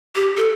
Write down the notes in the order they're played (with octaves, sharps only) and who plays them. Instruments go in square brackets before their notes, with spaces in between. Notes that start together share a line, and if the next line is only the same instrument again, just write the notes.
[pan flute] G4
A4